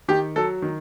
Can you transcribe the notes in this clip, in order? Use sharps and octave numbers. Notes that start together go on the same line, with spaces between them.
D#3 G4
F#3 A4
D#3